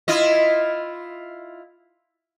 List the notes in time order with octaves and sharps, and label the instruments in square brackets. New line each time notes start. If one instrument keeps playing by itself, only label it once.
[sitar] E4 F4 D#5